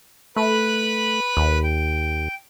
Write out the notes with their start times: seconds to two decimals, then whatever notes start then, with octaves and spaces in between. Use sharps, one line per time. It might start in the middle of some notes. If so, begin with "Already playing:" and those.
0.36 A3 B4 B5 F#6
1.37 D#2
1.63 G5